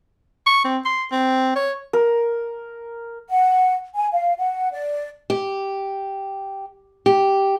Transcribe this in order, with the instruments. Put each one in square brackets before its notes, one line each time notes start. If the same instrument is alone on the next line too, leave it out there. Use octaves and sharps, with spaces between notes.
[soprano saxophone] C#6
C4
C6
C4
C#5
[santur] A#4
[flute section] F#5
G#5
F5
F#5
D5
[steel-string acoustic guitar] G4
G4